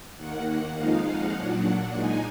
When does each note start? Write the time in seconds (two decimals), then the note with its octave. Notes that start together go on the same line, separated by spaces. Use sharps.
0.16 D#2 D#3 A#3 F#5
0.76 F2 F3 G#3 D#4 F5
1.06 F#5
1.34 A#2 F#3 D4 F#5
1.93 A#2 G#3 D#4 G#5